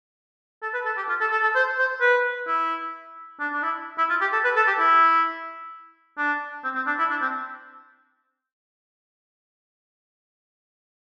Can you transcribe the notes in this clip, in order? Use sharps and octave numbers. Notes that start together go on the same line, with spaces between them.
A4
B4
A4
G4
F4
A4
A4
A4
C5
C5
B4
E4
D4
D4
E4
E4
F4
G4
A4
B4
A4
G4
E4
D4
C4
C4
D4
E4
D4
C4